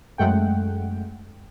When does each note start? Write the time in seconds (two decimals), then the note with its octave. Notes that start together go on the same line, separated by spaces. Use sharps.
0.18 F#2 G#3 A3 F#5 G5